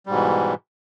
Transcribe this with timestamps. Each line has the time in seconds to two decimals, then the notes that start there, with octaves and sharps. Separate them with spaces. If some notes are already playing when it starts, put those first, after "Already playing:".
0.06 G3
0.09 G#2
0.11 B2
0.14 E3